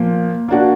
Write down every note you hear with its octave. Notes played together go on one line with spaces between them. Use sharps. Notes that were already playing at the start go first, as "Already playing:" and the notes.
Already playing: A#2 F3 A#3
A#3 D4 F#4